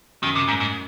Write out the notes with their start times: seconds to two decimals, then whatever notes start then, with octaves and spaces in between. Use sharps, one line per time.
0.22 F#2 D#3
0.35 C3
0.48 G#2
0.60 G#2